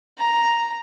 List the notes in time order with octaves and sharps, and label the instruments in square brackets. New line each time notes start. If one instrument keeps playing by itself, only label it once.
[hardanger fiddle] A#5